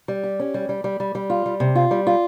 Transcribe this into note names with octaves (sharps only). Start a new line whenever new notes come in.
G3
G4
C#4
G3
G3
G3
G3
G3
F4
G3
C3
F4
G3
F4